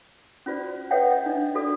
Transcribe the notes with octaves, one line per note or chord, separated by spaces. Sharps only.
C#4 F4 F#4 C5 D5
A4 B4 C#5 E5 F#5 G5
D#5
D4 D#5
D4 F#4 A4 D5